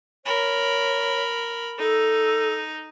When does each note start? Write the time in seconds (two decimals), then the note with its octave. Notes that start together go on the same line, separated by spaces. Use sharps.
0.26 A#4 C#5 B5
1.79 D#4 A4